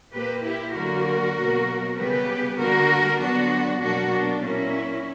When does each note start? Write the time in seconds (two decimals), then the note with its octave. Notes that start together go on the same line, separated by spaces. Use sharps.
0.13 A#2 A#3 G4 B4
0.43 E4 G4
0.74 D3 F#3 A#3 F#4 A#4
1.36 B2 F#3 A#3
1.96 C#3 G3 B3 G4 B4
2.58 D3 G3 A#3 F#4 A#4
3.19 D3 F#3 B3 D4 F#4
3.80 B2 F#3 A#3 D4 F#4
4.11 D4
4.41 A#2 F#3 A#3 C#4 E4